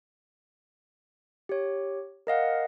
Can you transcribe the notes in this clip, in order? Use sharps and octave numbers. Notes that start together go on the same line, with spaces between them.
G4 C#5
A#4 D#5 F5 F#5